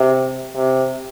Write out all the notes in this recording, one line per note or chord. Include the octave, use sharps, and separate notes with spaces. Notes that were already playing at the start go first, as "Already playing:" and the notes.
Already playing: C3
C3